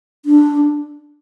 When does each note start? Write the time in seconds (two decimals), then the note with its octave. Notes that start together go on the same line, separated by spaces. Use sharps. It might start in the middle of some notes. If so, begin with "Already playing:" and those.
0.25 D4